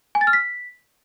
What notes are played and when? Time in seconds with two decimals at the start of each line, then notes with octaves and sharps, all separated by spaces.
0.15 G#5
0.21 A6
0.27 F6
0.33 B6